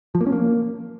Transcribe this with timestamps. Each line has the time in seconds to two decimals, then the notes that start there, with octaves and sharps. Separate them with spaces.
0.15 F3
0.21 A#3
0.27 C#4
0.32 A#3